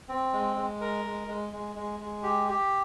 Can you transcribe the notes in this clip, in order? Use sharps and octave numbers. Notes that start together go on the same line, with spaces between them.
C4
G#3
G#3
A#4
G#3
G#3
G#3
G#3
G#3
G4
G4